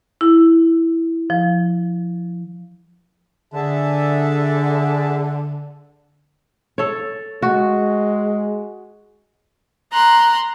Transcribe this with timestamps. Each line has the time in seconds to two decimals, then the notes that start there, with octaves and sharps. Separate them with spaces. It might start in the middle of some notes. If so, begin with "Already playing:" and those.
0.21 E4
1.30 F3
3.54 D3 G#4 E5 A5
6.78 A4 C#5
7.42 G#3 F#4
9.92 A#5 C6 F#6